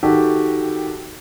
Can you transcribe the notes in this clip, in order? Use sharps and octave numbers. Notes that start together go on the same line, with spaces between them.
D#3 F#4 G4 A4